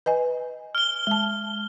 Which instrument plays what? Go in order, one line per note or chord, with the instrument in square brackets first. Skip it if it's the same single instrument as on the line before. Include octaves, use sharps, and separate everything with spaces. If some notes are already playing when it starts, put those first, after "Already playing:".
[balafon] B4 D#5 G#5
[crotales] F6 G7
[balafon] G#3 A5